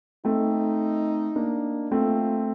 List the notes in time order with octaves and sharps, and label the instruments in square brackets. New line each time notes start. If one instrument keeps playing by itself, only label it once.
[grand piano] A3 C4 [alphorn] D#4
[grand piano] A#3 D4
[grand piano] A3 C4 [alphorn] F4